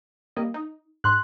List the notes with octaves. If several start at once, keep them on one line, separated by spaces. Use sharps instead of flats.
G3 A#3 D#5
D#4
G#2 C6 F#6